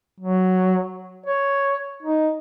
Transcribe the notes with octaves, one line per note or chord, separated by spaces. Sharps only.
F#3
C#5
D#4